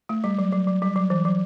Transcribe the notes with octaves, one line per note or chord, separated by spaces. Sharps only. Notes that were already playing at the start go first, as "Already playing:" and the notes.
A3
G3
F#3
F#3
F#3
G3
F#3
E3
F#3